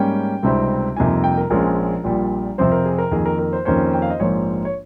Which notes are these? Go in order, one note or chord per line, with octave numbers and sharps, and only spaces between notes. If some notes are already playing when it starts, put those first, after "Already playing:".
Already playing: G#2 G3 A#3 C#4 G5
C#2 C3 G3 C4 D#4
F2 C3 G3 A#3 D#4 G#5
G5
A#4
A#1 A#2 F3 G#3 C#4 A#4
A#1 A#2 G3
F2 C3 F3 C4 C5
A#4
G#4
A#4
F2 D#3 A#3 G#4
A#4
A#4
C5
F2 D#3 A#3 C#4 C5
G5
F5
D#5
A#1 G#2 F3 A#3 C#5
C#5